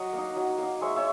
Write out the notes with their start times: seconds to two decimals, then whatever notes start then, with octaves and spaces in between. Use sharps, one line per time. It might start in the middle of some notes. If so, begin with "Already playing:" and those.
Already playing: F#3 D#5 F#5
0.13 A#3
0.18 D#4
0.36 F#3
0.58 A#3 D#4
0.81 G#3 C#5 E5
0.96 C#5 E5